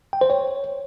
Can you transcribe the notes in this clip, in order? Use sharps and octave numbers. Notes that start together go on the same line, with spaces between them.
G5
C5
C#5